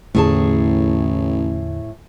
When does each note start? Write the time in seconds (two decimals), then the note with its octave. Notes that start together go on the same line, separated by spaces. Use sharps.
0.15 A1 E2 A2 D3 A3 G#4 A5